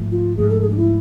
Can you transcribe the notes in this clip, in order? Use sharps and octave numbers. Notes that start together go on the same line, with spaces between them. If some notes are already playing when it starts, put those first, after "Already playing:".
Already playing: G#2 F3 A3
F4
G#2 F3 A3 G#4
A4
G#4
D4
E4